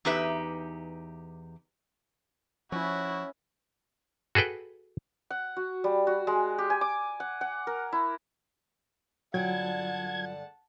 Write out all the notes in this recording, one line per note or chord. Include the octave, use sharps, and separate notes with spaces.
E2 D#4 G4 B4 E5
F3 C#4 E4 F#4
F#4 G#4 A4 B4 G5
F#5
F#4
G3
F#4
G#3
G4
G#5
D6
F#5
F#5
A#4
E4
G2 D3 F#3 F4 F#5 A5 G#6